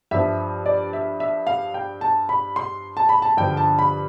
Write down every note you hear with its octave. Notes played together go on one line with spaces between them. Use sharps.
G2 F3 E5
D5
E5
E5
F5
G5
A5
B5
C6
A5
B5
A5
G2 D3 F3 G5
A5
B5